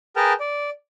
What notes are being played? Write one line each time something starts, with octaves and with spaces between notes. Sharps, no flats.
G#4 A#4 B4 G5 A5 F6
D5